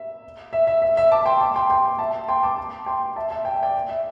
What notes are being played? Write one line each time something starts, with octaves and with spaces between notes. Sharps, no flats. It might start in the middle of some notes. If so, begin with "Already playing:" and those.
Already playing: E5
E5
E5
E5
E5
A5 D6
G5 C6
A5 D6
G5 C6
G5 C6
E5 A5
G5 C6
A5 D6
A5 D6
G5 C6
E5 A5
E5 A5
G5
E5
D5 G5
E5